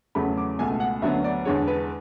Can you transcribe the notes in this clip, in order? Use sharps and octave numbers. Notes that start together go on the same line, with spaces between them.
E2 C#3 F#3 A3 B5
D6
C#2 B2 A3 G#5
F#5
D2 D3 F#3 B3 E5
D5
E2 D3 G#3 C#5
B4